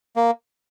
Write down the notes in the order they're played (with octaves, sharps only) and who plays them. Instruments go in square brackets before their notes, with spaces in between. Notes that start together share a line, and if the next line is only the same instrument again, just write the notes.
[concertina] A#3